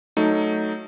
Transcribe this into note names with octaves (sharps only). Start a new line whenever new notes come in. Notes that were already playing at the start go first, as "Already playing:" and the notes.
F#3 A3 D#4